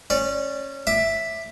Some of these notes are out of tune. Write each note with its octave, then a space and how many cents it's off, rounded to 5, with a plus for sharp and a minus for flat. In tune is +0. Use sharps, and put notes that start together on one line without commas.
C#4 -15 D5 +0
E5 +0 D6 +25